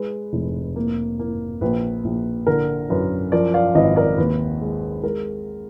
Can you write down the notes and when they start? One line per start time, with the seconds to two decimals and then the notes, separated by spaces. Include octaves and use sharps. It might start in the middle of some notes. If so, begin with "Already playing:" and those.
Already playing: G#3 B4
0.33 F1
0.76 A#3
1.19 A#3
1.61 A#1 B4
2.04 A#1
2.47 D3 A#4
2.90 F#2 B4
3.32 F3 A#4 D5
3.54 D5 F5
3.75 G#1 B4 D#5
3.96 A#4 D5
4.17 D#2 B4
4.61 G#3
5.03 G#3 A#4